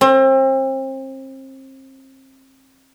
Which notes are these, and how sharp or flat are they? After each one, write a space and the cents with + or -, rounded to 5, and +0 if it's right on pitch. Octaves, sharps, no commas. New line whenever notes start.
C4 +35